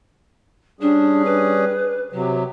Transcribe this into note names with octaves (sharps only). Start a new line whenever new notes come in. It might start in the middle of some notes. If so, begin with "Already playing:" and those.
G3 C#4 D4 G#4
B4
C3 F#3 G4